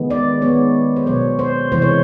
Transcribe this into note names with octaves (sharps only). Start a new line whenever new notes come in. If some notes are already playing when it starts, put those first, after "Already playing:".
Already playing: D#3 G#3 B3
D5
D#3 G#3 B3 C#5
C5
B2 F#3 B3 C#5
C5
C3 E3 G#3 C5
C#5